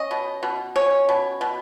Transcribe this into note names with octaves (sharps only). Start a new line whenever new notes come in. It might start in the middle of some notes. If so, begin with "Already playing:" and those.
Already playing: C#4 D#5
B2
B2
C#4 C#5
B2
B2